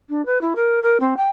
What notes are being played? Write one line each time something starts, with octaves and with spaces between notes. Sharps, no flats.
D4
B4
E4
A#4
A#4
C4
G5